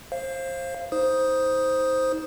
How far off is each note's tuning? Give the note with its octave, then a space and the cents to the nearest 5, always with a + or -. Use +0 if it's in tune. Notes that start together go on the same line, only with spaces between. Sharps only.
C5 +25 F5 -15
D#4 +30 C5 +0 D#6 +0